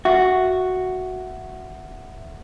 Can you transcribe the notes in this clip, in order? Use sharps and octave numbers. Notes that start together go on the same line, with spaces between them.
F#4 E5 F#5